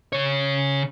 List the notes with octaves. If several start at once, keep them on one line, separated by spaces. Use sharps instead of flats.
C#3 C#5